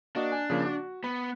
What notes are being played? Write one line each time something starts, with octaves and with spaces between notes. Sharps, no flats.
A#3 D4 F#4 D#5
G#5
C#3 F3 A#3
F#4
B3 B5